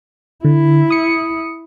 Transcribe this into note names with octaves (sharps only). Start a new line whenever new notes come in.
D3 E4
D#6 C#7